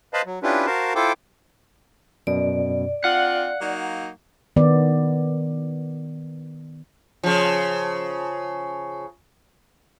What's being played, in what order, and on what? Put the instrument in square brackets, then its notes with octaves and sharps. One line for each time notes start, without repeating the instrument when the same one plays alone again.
[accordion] B4 C5 D#5 F5 A5 B5
F#3
C#4 D4 E4 F4 G4 B4
F#4 A#4 C5 F5 A5
E4 F4 A4 C5 G5 D6
[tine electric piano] F#2 B2 [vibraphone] D5
[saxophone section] C4 D4 F4 [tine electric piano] F5 [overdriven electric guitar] F#5
[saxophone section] F#3 A#3 D#4
[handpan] D#3 B3 D5
[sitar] C#3 F3